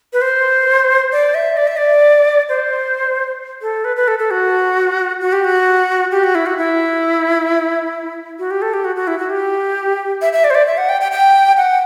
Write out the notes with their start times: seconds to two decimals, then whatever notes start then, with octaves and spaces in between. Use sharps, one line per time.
0.13 B4
0.22 C5
1.12 D5
1.35 E5
1.57 D5
1.67 E5
1.77 D5
2.49 C5
3.62 A4
3.85 B4
3.96 B4
4.08 A4
4.19 A4
4.31 F#4
5.21 F#4
5.33 G4
5.44 F#4
6.12 G4
6.24 F#4
6.35 E4
6.46 F#4
6.58 E4
8.39 F#4
8.51 G4
8.62 A4
8.73 G4
8.85 F#4
8.96 F#4
9.07 E4
9.19 F#4
9.30 G4
10.22 E5
10.33 E5
10.44 D5
10.50 C5
10.55 D5
10.67 E5
10.77 F#5
10.89 G5
11.01 G5
11.12 G5
11.57 F#5